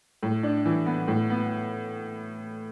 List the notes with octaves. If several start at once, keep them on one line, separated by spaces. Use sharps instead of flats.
A2
D4
E3
B3
A2
B3